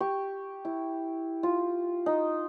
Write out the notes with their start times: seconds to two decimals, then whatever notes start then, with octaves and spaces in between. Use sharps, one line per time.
0.01 G4 C#6
0.65 E4
1.43 F4
2.06 D#4